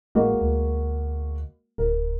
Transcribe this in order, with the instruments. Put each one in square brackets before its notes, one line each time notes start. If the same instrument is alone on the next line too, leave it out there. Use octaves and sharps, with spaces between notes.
[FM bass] A1 [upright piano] G#3 A#3 F#4
[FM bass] D2
[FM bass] D1 [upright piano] A#4